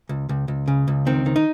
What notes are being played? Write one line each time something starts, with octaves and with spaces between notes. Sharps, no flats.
C#2
C#2
C#2
C#3
C#2
D#3 C4
D#3
D#4